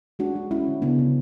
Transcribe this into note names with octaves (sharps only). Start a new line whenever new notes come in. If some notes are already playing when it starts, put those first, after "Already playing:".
G#3 D4 F#4
G#3
G#3 C#4 E4
D3
C#3 B3 D4
C#3